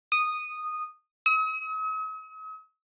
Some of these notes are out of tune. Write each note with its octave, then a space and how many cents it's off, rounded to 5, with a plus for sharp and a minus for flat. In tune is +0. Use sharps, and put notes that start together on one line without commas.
D#6 -10
D#6 +45